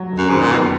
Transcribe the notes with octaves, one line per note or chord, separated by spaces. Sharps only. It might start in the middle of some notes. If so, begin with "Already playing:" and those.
Already playing: F#3
F1
F#2
G#2 D#3
A#2
F#1 B2